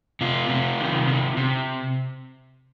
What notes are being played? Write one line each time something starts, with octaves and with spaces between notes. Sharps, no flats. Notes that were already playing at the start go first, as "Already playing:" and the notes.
C3 F4
C3
D#3
C3
C3